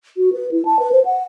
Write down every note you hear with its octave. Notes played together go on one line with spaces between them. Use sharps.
F#4
B4
E4
A5
B4
C5
F#5